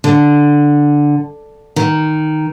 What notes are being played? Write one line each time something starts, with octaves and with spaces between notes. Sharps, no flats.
D3
D#3